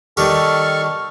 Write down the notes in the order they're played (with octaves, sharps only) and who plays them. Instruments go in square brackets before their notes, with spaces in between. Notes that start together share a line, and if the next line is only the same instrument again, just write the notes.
[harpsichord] D#3 G3 G4 [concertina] A4 C#6 F6